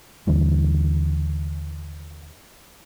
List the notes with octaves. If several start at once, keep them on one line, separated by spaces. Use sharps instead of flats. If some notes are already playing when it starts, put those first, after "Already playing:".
D#2 D3 E3 G3